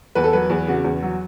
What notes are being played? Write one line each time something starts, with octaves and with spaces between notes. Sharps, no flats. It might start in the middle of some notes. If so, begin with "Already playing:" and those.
E2 B4
A4
F#3 B4
E2
C#3 F#4
E2
F#3